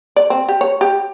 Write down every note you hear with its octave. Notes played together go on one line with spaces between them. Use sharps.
D5
C4
G4
C#5
G4